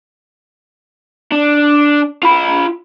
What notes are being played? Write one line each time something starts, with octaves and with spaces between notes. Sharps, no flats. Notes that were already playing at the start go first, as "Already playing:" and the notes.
D4
F4 B5